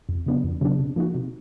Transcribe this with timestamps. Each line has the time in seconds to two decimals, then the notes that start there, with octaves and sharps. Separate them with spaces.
0.09 F2
0.26 C#3 F#3 B3 D4
0.44 F2
0.61 C#3 F#3 B3 D4
0.79 C3
0.96 F3 A#3 D#4 F#4
1.15 C3